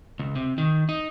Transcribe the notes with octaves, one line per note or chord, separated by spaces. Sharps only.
C#2
C3
D#3
D#4